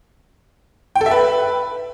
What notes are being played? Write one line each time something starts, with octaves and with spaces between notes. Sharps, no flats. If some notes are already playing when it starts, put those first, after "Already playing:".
G5
A4
E5
B4